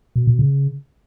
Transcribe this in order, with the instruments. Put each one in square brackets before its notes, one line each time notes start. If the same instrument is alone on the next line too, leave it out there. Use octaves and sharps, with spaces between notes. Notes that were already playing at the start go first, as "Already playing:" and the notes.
[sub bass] B2
B2
C#3